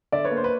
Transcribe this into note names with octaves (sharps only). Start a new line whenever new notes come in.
D3 D5 E5
B4 C#5
A#3
C5
B4